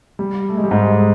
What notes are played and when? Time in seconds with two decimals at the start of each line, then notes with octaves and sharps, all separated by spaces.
0.19 G3
0.49 A3
0.57 G#3
0.64 G3
0.71 G#2 G#3